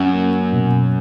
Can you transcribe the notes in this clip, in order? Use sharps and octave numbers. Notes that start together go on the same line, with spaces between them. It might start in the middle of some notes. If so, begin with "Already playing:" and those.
Already playing: F#2 C#4
A#3
B2